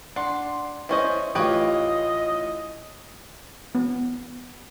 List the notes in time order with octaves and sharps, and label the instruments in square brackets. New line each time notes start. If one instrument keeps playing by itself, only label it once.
[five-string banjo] D4 [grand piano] F#5 C6
[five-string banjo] E3 C#4 C5 [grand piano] D5 D#5
[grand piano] A1 F4 [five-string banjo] G4 B4 C#5 [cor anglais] D#5
[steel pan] B3